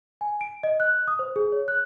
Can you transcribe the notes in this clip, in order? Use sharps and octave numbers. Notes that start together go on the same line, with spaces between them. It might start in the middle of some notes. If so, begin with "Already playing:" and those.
G#5
D7
D#5
F#6
D#6
C5
G#4
C#5
F#6